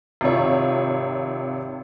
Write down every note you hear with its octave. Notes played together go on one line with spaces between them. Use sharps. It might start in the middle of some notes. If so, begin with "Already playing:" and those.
G#1 C3 F4 C#5